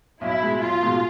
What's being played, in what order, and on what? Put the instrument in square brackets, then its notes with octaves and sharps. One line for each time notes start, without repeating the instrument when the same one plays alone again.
[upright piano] B1 [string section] E4
[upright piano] B2 G#3
[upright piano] B1 [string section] F4
[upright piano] B2 G#3